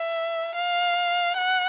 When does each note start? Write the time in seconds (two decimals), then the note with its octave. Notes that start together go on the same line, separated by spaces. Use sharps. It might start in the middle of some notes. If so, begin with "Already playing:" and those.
Already playing: E5
0.55 F5
1.38 F#5